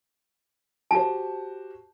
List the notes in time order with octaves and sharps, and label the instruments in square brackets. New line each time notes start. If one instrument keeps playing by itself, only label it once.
[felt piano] F#4 G4 C5 [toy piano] A5